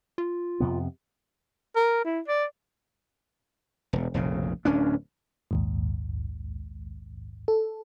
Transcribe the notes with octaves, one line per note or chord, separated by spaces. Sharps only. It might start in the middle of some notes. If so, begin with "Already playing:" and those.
F4
F2 C3 B3
A#4
E4
D5
E1
F1 A#1 C#3
D1 C#4 D4
A#1 D#2 G#2
A4